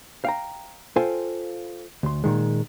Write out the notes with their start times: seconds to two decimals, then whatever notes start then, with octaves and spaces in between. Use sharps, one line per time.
0.25 F5 G5 A#5
0.96 F4 A4 C5 F5 G5 G#5
2.03 D2 C6
2.24 A#2 D#3 G#3